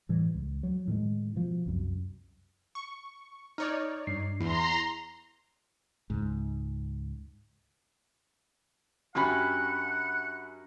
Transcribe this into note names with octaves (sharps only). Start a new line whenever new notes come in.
A2 E3 G3
C#2
F#3
A2 D#3 F#3 G#3
B2 F3
C2 F#2
C#6
D#4 C#5 D5 F6
G2 C7
E2 E4 A#5 C6
C#2 G#2
F#2 C#4 D4 G4 F#5 B5